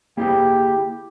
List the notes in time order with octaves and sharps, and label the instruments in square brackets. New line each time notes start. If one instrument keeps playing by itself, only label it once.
[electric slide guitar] A#3 E4 G#4 [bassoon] G4